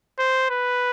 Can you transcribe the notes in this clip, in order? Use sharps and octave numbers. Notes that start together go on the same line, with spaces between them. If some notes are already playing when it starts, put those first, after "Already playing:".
C5
B4